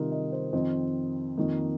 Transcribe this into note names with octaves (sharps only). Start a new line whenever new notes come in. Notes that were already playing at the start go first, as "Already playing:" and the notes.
Already playing: C3 D#3 G3 D#4 F4 A#4
D#5
C5
F2 D#3 C4 D#5
F2 D#3 A#3 D#4